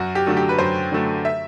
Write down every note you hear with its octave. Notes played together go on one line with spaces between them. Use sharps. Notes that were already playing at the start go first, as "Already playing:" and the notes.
Already playing: F#2 F#4
G4
D3 F#3 A3
G4
B4
F#2 C5
D3 F#3 A3
E5